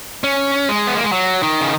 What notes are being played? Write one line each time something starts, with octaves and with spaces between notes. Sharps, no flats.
C#4
G#3
B3
A#3
G#3
F#3
D#3
C#3